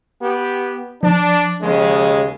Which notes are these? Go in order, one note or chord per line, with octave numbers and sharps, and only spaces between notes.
B3 G4
F3 D4
D#2 C#3 G#3